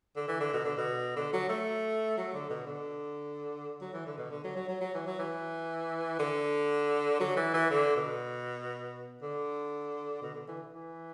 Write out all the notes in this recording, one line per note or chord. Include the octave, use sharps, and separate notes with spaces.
D3
E3
D3
B2
D3
B2
D3
F#3
A3
F#3
D3
B2
D3
F#3
E3
D3
B2
D3
F#3
F#3
F#3
F#3
E3
F#3
E3
D3
F#3
E3
E3
D3
B2
D3
B2
D3
E3
E3